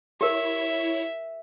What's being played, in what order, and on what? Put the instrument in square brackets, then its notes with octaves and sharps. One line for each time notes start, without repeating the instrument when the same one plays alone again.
[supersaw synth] E4 C#5 [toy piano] G4 A#4 [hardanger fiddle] E5